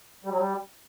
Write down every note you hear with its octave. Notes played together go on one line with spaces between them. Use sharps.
G3
F#3
G3